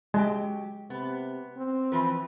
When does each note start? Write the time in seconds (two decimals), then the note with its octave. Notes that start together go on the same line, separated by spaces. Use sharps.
0.14 F#3 G#3 G4
0.90 C3 B3
1.57 C4
1.92 E3 F3 B4